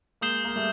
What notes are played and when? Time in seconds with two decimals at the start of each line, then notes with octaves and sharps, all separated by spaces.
0.21 G#3 A#3 D#6 G6 C7 E7 G7
0.44 A#3
0.56 G3 A3